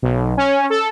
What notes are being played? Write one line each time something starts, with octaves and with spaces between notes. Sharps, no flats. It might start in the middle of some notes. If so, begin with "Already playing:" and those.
B1
C#4
A4